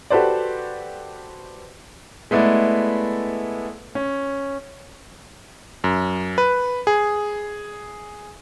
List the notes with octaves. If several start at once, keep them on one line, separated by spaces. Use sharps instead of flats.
F#4 G4 A4 B4 C5 D5
G#3 A3 B3 E4 D5
C#4
F#2
B4
G#4